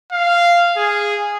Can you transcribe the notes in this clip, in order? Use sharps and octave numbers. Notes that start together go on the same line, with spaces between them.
F5
G#4